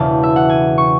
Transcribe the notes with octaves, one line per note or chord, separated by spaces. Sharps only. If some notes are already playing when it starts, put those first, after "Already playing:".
Already playing: E1 E2 C#3 E3 A5
E5
F#5
G#5
C#6